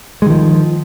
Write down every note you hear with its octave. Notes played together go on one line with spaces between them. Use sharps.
D#3 F3 G#3